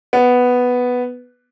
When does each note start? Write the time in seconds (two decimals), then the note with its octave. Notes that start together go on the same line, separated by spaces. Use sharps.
0.13 B3